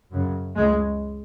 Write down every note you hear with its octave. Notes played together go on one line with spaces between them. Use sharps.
F#2 C#3
C#2 C#3 G#3